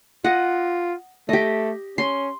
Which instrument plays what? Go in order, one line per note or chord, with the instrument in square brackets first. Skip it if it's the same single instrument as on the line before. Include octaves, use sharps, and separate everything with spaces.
[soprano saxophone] F4 [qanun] D#5 F#5
[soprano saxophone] A3 [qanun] G4 D#5
[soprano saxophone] C#4 [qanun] C6